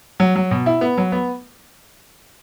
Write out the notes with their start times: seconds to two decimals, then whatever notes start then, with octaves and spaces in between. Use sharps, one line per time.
0.20 F#3
0.36 F#3
0.51 B2
0.66 E4
0.81 B3
0.98 F#3
1.12 B3